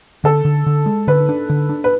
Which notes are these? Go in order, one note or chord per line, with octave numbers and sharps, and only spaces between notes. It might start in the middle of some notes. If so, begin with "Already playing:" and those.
D3 A4
D3
D3
G#3
D3 B4
D4
D3
D4
B4